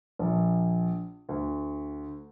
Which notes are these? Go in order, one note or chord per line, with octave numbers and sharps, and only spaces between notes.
A#1
D2